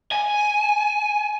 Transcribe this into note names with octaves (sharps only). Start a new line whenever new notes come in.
G#5